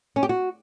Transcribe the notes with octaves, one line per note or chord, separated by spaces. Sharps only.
C#4
G4
F#4